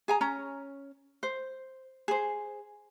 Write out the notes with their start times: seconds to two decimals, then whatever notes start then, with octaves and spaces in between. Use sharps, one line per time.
0.08 G#4 G#5 A#5
0.21 C#4 C#5 A#5
1.23 C5
2.08 G#4 C5